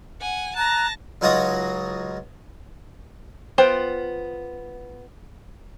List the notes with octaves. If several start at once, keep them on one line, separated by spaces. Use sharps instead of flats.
F#5 G#5
A5 A#5 F#6 G#6 A#6
C#2 F#3 D#4 F4 F#4 D#6
B3 F4 C5 G5